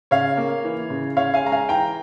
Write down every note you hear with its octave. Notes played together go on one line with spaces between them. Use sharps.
C#3 C#5 F5
A#3
E3
C#3
C#3 C#5 F5
F5 G#5
G#3 A#5
F5 G#5
E3 G5 A#5